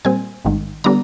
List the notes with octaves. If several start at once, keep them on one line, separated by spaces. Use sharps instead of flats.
A#2 G3 C4 G#5
A1 G#2 D#3
D3 G3 B3 D4 A#5